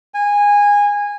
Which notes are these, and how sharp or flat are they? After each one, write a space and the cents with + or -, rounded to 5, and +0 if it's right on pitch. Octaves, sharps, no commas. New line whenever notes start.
G#5 -20